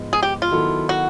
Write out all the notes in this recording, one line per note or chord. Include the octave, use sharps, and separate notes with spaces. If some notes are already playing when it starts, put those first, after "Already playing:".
Already playing: G#2 F3 G#3 B3
G#4
G4
F4
D#3 F#3 B3 E4 A4
F#4